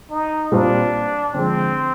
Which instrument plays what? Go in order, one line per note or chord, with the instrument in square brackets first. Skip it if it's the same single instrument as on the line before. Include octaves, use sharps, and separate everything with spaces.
[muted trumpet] D#4
[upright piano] A#2 G3 C4 F4 [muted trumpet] D4
[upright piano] D3 F3 G#3 [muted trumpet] C4